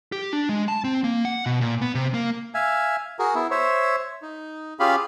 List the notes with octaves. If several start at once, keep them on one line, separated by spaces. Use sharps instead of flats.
G4
D4
G#3
A5
C4
A#3
F#5
B2
A#2
B3
C3
A#3
E5 F5 G#5
F#4 G#4 A#4
B3 E4
C5 C#5 E5
D#4
C#4 F4 G4 G#4 F5 B5